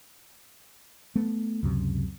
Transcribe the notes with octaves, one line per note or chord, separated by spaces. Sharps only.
A3 B3
C#2 F#2 C3